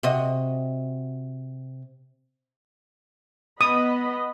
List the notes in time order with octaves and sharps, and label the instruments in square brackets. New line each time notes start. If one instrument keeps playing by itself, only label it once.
[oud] C3 F#4 D#5
[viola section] B3 D#5 B5 [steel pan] D#6